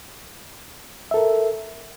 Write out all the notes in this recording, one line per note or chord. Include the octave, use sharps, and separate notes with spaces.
A4 A#4 E5